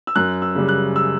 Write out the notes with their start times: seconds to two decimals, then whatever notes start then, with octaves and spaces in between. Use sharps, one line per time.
0.07 E6
0.15 F#2 F#6
0.42 E6
0.55 C#3 G3
0.68 F#6
0.96 E6